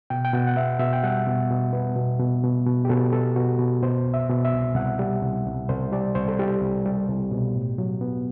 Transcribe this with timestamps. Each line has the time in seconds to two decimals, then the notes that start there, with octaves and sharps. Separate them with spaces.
0.10 B2 G5
0.25 G5
0.33 B2 F#5
0.47 F#5
0.56 B3 E5
0.79 B2 E5
0.93 G5
1.03 G3 F#5
1.27 B2
1.50 B2
1.73 B3
1.96 B2
2.20 B2
2.44 B2
2.66 B2
2.85 G4
2.89 B2 A4
3.12 B2 A4
3.36 B2 F#4
3.59 B2
3.83 B2 C5
4.06 C2
4.14 E5
4.30 B2
4.45 E5
4.53 C2
4.75 C2 F#5
4.99 G3
5.22 C2
5.46 C2
5.69 C2 C5
5.92 G3 D5
6.15 C2 C5
6.28 A4
6.39 G3 G4
6.61 C2
6.85 G3
7.09 C2
7.31 B2
7.55 A2
7.78 F#3
8.01 B3